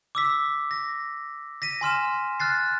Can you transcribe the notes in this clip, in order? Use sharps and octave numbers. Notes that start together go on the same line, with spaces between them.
D6 E6 B6
A#6
A#6 B6 D#7
G#5 C6 F6 E7
F6 F#6 A6 C7